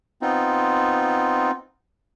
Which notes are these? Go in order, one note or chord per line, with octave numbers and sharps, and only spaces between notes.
B3 C4 D#4 F4